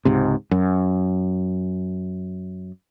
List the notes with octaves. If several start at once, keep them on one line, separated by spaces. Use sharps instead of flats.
C#2 G#2 C3
F#2